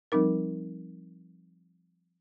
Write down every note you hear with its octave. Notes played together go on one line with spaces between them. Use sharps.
F3 G3 C4 D#4 A#4